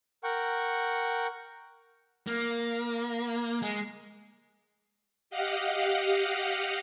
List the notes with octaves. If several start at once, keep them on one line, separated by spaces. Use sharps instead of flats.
A#4 F#5 G5 C#6
A#3
G#3
G4 D#5 F5 F#5